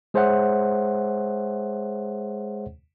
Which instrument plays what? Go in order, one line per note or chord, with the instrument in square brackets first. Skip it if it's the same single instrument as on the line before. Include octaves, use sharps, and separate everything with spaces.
[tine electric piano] G#3 G#4 C5 C#5 E5 F#5